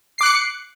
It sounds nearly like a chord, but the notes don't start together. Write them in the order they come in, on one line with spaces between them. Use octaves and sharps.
C7 D6 F#6 C#7